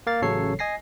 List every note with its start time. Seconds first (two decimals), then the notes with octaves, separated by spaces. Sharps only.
0.07 A#3 F5 A6
0.22 A1 C#3 F#3 A4 C#5 C7
0.59 D#5 G#5 A#6 C7